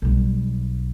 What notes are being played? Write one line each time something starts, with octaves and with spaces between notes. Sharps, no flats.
B1 G3